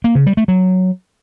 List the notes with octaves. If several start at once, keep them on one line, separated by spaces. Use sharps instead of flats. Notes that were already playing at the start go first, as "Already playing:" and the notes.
A#3
C#3
G3
A3
F#3